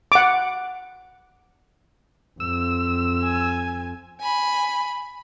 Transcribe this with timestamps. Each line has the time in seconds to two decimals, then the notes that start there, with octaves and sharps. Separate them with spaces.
0.12 F#5 D6
2.40 F2 E6
3.23 G#5
4.21 G#5 B5